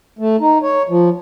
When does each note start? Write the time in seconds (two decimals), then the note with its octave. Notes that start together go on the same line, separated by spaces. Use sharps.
0.19 A3
0.40 D#4
0.62 C#5
0.89 F3